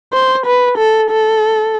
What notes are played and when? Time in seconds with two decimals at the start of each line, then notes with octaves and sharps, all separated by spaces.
0.13 C5
0.46 B4
0.78 A4
1.10 A4